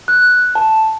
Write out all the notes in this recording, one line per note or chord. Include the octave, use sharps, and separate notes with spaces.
F#6
A5